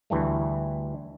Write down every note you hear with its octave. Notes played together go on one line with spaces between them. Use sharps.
D2 E3 G3 A3